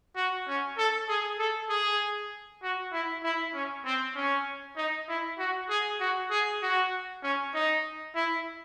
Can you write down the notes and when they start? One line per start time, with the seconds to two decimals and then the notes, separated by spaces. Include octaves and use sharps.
0.16 F#4
0.47 C#4
0.78 A4
1.09 G#4
1.38 A4
1.69 G#4
2.63 F#4
2.92 E4
3.24 E4
3.54 C#4
3.85 C4
4.15 C#4
4.76 D#4
5.08 E4
5.39 F#4
5.69 G#4
6.00 F#4
6.31 G#4
6.62 F#4
7.23 C#4
7.54 D#4
8.15 E4